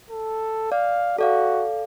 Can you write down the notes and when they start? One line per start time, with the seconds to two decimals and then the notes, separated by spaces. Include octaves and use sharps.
0.10 A4
0.72 D5 F5
1.18 F#4 A4 D5 F5